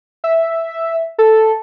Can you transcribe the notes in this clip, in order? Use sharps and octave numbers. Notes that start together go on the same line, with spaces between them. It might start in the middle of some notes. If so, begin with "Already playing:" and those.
E5
A4